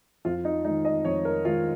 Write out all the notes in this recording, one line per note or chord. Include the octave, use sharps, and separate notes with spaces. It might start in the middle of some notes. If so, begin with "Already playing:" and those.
F2 F4
D#4
D#3 G#3 D#4
D#5
F2 C#5
A#4
D#3 G#3 F4